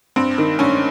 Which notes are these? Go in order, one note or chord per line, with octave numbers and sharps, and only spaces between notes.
G2 C4
D#3
G2 C#4